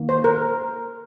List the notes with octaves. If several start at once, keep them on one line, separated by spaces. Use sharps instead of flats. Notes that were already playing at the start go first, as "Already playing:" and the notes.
Already playing: D#3 A#3
C5
A#4